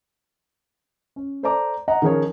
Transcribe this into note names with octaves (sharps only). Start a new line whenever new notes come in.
C#4
A4 C5 D5 A5 A#5 D6
D#5 F#5 A#5
D#3 F3 C#4 G#4 A#4 C#5